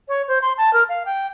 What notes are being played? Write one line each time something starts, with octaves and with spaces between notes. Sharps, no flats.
C#5
C5
C6
A5
A#4
F5
G5